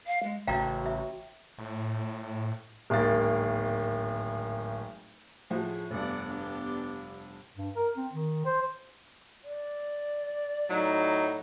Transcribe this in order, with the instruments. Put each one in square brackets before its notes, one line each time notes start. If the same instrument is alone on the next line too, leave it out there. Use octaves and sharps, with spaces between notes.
[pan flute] F5
G#3
[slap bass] A1 C#3 [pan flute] F#4 [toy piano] F5 G5 A#5
[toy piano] E5
[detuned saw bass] A2
[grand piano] D1 G#1 A#3 A6
[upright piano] A2 F3 F#4 [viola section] G#4
[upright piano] F1 G2 [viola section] B3 D5 F#5
[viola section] B3 D4 G4
[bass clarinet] G2
A#4
C4
D#3
C5
[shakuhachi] D5
[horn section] A2 F#3 D#4